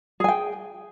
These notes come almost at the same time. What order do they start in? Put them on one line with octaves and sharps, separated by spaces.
G#4 G#5 G5